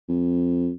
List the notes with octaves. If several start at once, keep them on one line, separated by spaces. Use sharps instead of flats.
F2